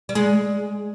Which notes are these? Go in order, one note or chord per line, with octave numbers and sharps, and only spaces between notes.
G3
G#3